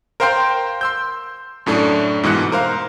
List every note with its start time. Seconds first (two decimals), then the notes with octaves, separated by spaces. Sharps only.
0.20 A#4 C5 F5 G5 C6 G6
0.81 C6 E6 G6
1.66 F#2 A2 A3 D4
2.23 G#2 B2 E3 F#6 C#7
2.52 A#4 C5 F5